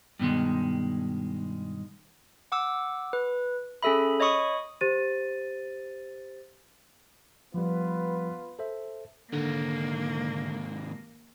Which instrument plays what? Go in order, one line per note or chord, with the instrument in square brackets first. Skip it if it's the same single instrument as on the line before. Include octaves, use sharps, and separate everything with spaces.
[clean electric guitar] G2 B2 D#3 G#3
[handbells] F#5 D6 E6
B4
C#4 G#4 A4 E5 B5
C#5 D#5 B5 C#6 D#6
[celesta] G4 C5 A6 D#7
[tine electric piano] F3 G3 [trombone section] B3 F4 B4
[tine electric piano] A4 C5 E5
[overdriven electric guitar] D#2 G#2 [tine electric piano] D3 [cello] A#3